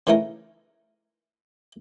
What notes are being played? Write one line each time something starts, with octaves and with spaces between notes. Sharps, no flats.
C#3 E3 A3 D#4 A#4